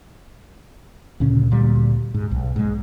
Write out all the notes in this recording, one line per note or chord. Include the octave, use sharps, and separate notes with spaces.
D2 A#2 C#3 C#4
D2 A#2 G3
G#2
B1
G#2 G#3